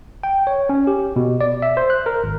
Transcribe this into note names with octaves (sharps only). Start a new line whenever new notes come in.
G5
C#5
C#4
G4
B2
D5
E5
C5
F#6
A#4
G#1